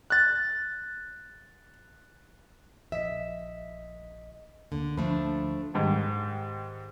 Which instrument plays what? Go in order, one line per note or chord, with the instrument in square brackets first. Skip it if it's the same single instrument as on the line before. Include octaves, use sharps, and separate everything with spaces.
[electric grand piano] F#6 A6
[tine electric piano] A#1 D#5 B6 [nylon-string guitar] E5
[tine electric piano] D2 A#3 [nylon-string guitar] D3
[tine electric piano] D2 D3 B5 [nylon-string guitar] F3 A3 D4
[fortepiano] G#2 D#3 G3